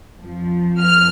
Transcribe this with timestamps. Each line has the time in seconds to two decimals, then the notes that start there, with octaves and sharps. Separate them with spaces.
0.20 F2 F3
0.80 F6